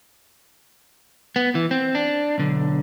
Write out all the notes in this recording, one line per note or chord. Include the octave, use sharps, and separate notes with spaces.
B3
E3
C4
D4
B1 D3